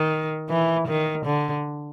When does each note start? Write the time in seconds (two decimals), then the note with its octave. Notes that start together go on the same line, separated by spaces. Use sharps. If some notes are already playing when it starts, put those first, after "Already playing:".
Already playing: D#3
0.50 E3
0.88 D#3
1.26 D3